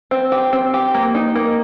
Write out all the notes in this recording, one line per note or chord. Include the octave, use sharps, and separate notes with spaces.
C4
G4
C4
G4
A#3
D#4
A#3